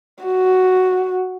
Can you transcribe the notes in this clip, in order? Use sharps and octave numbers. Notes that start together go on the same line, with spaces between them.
F#4